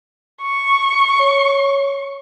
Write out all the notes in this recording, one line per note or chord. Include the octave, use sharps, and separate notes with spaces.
C#6
C#5